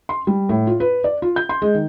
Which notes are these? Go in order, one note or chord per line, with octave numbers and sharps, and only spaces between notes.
C6
G3
A2
F4
B4
D5
F4
G6
C6
G#3
D#3